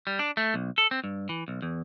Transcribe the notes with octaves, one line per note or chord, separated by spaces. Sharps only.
G3
D4
A3
B1
A4
C4
G2
E3
B1
E2